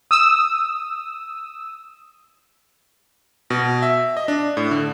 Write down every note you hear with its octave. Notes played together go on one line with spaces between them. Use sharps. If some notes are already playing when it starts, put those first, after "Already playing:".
D#6 E6
B2
E5
D#5
D4
A2
D3